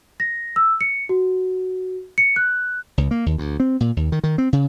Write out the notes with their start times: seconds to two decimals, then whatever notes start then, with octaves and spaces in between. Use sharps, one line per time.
0.20 A#6
0.56 E6
0.81 C#7
1.09 F#4
2.18 C#7
2.36 F#6
2.98 C#2
3.11 A#3
3.26 D#2
3.38 D2
3.60 C4
3.80 A#2
3.96 D#2
4.12 D#3
4.24 D#3
4.38 C4
4.53 C#3